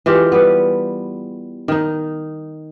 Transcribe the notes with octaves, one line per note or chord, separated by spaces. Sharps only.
E3 G#3 F4 G4
G3 B3
D#3 D#4